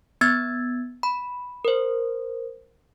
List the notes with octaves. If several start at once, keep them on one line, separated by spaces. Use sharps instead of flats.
B3 E6 G#6 A6
B5
A#4 C5